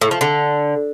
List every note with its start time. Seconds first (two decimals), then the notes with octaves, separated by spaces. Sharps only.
0.02 A2
0.11 F3
0.21 D3